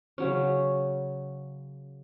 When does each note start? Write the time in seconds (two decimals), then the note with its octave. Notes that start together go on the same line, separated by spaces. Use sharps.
0.18 C#3 F#3 C#4